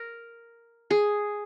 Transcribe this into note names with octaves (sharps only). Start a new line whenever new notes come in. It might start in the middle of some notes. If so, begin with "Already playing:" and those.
Already playing: A#4
G#4